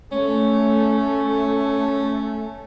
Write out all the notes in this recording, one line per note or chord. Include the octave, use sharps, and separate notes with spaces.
A3 C#4